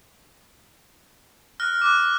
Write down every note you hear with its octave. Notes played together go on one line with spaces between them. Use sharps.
F6 F#6 A#6
D6 F#6